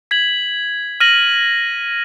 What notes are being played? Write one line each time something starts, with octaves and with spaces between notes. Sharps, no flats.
G#6 B6 F#7
F6 A#6 D#7 F#7